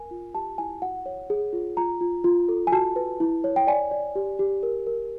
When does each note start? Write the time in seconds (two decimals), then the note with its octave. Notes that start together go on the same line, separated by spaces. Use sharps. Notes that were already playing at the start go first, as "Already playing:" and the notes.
Already playing: A#4 G#5
0.11 F4
0.35 G4 A5
0.58 E4 G#5
0.82 F#4 F#5
1.06 C#5
1.30 G#4
1.53 F4
1.77 F4 A#5
2.01 F4
2.24 F4
2.49 A4
2.67 G#5
2.72 F#4 A5
2.96 B4
3.20 E4
3.44 C#5
3.56 G5
3.67 D5 G#5
3.91 D5
4.16 G4
4.39 G4
4.63 A#4
4.87 A#4